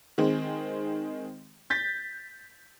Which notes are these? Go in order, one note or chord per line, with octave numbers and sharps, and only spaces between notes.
D#3 G#3 C4
G6 A6 B6